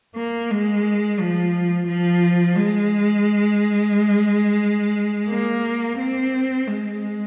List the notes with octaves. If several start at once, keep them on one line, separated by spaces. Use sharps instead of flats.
A#3
G#3
F3
F3
G#3
A#3
C4
G#3